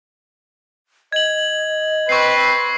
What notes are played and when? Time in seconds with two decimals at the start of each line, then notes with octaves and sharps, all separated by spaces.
1.12 D#5 G#6 F#7
2.09 C4 B4 C#6 C7